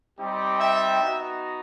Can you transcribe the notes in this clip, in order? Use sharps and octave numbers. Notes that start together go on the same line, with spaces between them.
G3 C4 D#4 G4
E5 G5
B3 D#4 F#4